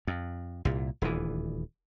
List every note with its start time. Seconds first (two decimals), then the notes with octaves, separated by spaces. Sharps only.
0.07 F2
0.65 C2 A#2
1.02 D#1 D2 E3